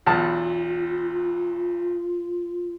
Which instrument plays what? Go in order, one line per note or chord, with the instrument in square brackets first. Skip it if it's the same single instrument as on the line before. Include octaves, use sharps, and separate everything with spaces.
[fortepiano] B1 E2 A5 [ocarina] F4